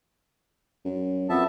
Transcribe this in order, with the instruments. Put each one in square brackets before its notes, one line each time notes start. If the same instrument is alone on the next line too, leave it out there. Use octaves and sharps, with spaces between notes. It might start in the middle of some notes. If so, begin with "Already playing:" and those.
[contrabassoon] F#2
[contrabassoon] F2 [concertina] B3 E5 A5